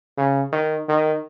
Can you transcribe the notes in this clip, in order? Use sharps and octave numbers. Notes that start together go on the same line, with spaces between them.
C#3
D#3
D#3